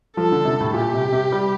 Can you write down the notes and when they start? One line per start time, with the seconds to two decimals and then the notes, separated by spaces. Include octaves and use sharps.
0.17 F3 A4
0.32 D3
0.45 C3
0.60 A2
0.74 A#2 G4
0.94 C3
1.12 C3
1.32 G3